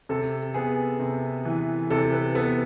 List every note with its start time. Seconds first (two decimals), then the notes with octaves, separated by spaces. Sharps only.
0.09 C3 A4
0.54 B3 G#4
1.00 C3
1.45 E3
1.90 C3 A4
2.12 B4
2.35 B3 A4